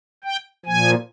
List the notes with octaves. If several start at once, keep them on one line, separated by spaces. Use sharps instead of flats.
G5
A#2 F3 G#5